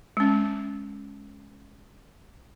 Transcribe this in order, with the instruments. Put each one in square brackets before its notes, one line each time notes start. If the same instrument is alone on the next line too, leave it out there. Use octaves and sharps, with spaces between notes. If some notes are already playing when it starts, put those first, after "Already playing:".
[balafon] G#3 C#4